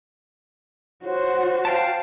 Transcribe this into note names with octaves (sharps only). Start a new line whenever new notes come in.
F#4 C5 C#5
F5 G5 A5